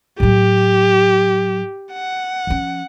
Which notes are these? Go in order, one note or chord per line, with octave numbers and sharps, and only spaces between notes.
A2 F#3 G4
F#5
F3 C#4